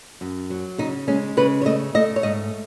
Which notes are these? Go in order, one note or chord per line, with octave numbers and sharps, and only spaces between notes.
F#2
F#3
C#3 D#4
G#3 C#4
C#3 B4
C#5
A3 D#5
A3 D#5
C#5
G#2 D#5